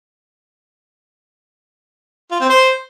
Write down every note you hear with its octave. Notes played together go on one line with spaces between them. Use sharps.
F4
C4
C5